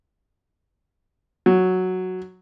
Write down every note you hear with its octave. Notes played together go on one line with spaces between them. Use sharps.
F#3